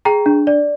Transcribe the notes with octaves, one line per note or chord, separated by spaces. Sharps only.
G#4 G5 A#5
D4
D5